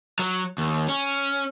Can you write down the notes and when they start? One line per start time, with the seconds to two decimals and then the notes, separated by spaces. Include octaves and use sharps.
0.19 F#3
0.58 D#2
0.88 C#4